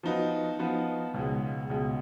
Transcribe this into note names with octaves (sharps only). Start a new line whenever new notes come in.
F3 B3 D#4 F#4 B4
F3 B3 D#4 F#4 B4
C#2 B2 G#3
C#2 B2 G#3